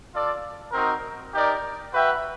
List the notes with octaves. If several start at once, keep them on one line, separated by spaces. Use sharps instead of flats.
F4 A4 D5
C4 D#4 F#4 A#4
D#4 G4 A#4 D5
F#4 B4 E5 G5